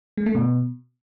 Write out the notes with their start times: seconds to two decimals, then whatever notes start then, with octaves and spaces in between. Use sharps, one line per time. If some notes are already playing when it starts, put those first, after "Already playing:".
0.17 G#3
0.26 A3
0.35 B2